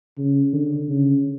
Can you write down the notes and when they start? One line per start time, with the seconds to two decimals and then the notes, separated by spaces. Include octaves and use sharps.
0.18 C#3
0.53 D3
0.89 C#3